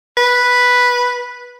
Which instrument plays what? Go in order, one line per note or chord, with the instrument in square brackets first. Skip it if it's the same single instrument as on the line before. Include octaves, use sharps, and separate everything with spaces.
[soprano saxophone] B4